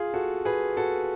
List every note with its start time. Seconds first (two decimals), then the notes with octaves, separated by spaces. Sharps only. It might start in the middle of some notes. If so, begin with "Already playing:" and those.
Already playing: F4 G#4
0.14 F#4 A4
0.45 G#4 B4
0.77 F#4 A4